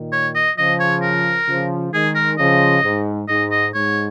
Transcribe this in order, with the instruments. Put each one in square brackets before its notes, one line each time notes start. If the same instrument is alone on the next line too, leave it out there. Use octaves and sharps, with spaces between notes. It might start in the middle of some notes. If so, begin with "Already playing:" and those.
Already playing: [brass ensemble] A#2 D#3
[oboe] C#5
D#5
[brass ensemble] C#3 F3 [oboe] D#5
[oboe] C#5
A#4
[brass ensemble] C#3 F3
[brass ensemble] D#3 G#3 [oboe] G#4
[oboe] A#4
[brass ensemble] C#3 F3 [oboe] D#5
[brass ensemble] G#2
[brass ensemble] G#2 [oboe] D#5
[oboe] D#5
[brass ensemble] G#2 [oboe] C#5